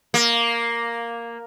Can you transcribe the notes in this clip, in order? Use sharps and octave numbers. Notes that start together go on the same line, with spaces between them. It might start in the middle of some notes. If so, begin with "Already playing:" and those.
A#3